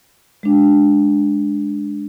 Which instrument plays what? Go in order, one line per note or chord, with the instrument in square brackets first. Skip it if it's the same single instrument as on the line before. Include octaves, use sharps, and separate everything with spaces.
[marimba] G#3 D4